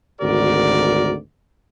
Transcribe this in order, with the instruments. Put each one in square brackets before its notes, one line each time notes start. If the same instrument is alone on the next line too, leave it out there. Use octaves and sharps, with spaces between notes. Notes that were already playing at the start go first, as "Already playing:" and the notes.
[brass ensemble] G#1 D2 F#4 A#4 D5